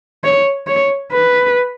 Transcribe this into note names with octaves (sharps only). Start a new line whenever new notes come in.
C#5
C#5
B4